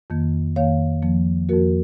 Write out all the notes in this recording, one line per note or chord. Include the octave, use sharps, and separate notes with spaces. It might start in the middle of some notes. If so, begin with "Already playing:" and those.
F2 D#3 A#3
F2 D#3 A#3 C#5 F5
F2 F3 A#3
F2 F3 A#3 F#4 A#4